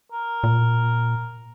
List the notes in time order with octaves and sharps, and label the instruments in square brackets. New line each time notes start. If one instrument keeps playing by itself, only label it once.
[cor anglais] A#4
[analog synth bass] A#2